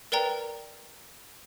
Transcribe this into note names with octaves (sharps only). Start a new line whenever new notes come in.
A#4 B4 D5 G5 A#5